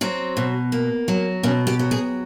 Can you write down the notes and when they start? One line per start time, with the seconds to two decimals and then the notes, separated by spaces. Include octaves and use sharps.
0.01 F#3 C4
0.37 B2
0.72 A#3
1.08 F#3
1.43 B2 C#4
1.67 G4
1.79 F#3
1.91 G#4